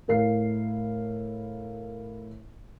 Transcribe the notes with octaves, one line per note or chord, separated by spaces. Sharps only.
A2 A#4 F5 C7